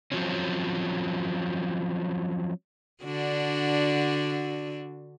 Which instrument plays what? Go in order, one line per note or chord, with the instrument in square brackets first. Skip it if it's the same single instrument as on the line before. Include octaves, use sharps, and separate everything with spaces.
[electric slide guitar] F3 F#3 C4 C#4
[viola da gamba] D3 D4 F#4